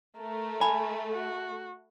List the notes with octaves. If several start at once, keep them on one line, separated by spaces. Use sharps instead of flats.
A3 A#4
G#5 A5 B5
F#4